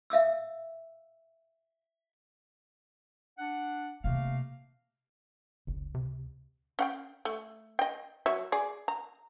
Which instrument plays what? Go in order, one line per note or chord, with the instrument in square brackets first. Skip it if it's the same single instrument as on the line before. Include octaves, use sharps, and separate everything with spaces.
[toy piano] E5 F5 D#6 E6
[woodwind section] D4 F#5
[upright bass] C3 D#3 [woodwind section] A3 A#3 F5
[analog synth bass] F#1 [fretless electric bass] C#2
[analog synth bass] C3
[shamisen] C#4 F#5 G5
A3
D#5 G5
F#3 C#5 E5
G#4 D5
A#5